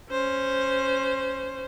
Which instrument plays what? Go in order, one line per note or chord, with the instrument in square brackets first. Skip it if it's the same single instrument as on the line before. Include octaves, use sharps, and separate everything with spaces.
[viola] C#4 C5